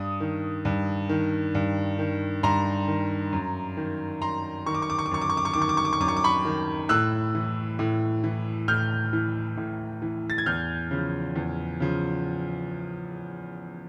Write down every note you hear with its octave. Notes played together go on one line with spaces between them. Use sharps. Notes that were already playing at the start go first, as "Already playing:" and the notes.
Already playing: G2 D#6
D#3
G2
D#3
G2
D#3
G2 A#5 C6
D#3
F#2
D#3
F#2 A#5 C6
D#3 C#6
D6
C#6
D6
C#6
D6
F#2 C#6
D6
C#6
D6
C#6
D#3 D6
C#6
D6
C#6
D6
C#6
F#2 D6
C#6
D6
B5 C#6
D#3
A2 E6 F#6
E3
A2
E3
A2 F6 G6
E3
A2
E3
A6
G#6
E2 F6 G6
C#3 F3
E2
C#3 F3